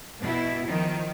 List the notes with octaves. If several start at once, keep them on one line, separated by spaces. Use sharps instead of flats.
B2 E4
D#3 F3